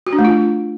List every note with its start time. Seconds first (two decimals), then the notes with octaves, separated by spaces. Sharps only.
0.07 F#4
0.13 D4
0.19 A3
0.25 F4